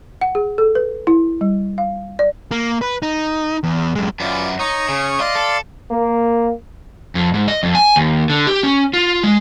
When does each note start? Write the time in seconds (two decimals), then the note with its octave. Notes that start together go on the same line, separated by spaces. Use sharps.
0.21 F#5
0.35 G#4
0.58 A4
0.75 B4
1.07 E4
1.41 G3
1.78 F5
2.19 D5
2.51 A#3
2.82 B4
3.02 D#4
3.64 E2
3.95 F#2 G#3
4.20 F#2 B3 F4 D5
4.59 D#4 C#5 C#6 D#6
4.89 C#3
5.20 D5 D#5 F5 C6
5.35 A4
5.91 A#3
7.15 F2
7.34 G#2
7.48 D#5
7.63 F2
7.75 G#5
7.96 D#2
8.30 D3
8.47 G4
8.63 C#4
8.93 F4
9.23 G#3